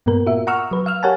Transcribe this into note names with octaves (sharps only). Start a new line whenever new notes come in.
G2 A#2 A#3 B3 A#4
F4 F#4 A#4 E5
F#5 A#5 C#6 E6 F6
F#3 B4
F5 E6 F6
G4 A#4 C#5 F#5 G#5 A5